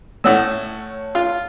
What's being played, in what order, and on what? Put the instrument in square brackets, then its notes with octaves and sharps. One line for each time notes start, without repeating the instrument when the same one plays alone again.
[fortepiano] A2 C#4 E6 [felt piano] A3 C#5 F#5
[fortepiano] F4